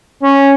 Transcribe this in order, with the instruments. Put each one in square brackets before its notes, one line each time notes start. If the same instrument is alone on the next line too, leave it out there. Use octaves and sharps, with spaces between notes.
[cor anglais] C#4